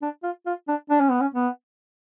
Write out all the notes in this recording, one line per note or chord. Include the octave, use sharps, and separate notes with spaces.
D4
F4
F4
D4
D4
C#4
B3
C#4
B3